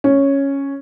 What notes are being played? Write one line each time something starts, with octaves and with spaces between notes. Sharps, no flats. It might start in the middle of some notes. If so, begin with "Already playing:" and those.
C#4